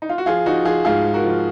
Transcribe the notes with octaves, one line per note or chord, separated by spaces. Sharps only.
D#4
F4
F#4
F3 F4 G#4
F3 D#4 F#4
F3 F4 G#4
G#2 F4 G#4
G#2
F#4 A#4
F3